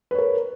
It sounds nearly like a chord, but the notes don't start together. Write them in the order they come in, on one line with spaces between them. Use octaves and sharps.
B4 C#5 A#4